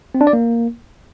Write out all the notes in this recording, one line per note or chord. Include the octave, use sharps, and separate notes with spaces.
C4
D4
D5
A#3